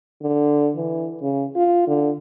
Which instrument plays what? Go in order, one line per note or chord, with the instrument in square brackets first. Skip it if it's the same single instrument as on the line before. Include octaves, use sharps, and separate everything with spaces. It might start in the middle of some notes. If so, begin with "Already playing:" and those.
[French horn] D3
E3
C#3
F4
D3